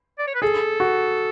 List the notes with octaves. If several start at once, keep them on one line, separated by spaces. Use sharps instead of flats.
D5
C#5
B4
G#4 A4
F#4